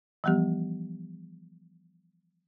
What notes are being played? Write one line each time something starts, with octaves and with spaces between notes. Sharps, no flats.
E3 F3 G3 B3 G4